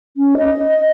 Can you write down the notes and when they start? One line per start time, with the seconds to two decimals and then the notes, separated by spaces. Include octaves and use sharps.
0.17 C#4
0.38 D#5